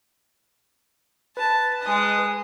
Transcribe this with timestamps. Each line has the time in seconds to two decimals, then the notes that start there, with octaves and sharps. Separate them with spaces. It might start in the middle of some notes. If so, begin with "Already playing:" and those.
1.37 B4 A5
1.82 G#3 D#5